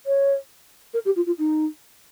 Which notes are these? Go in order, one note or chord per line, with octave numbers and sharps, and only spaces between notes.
C#5
A#4
G4
F4
F4
D#4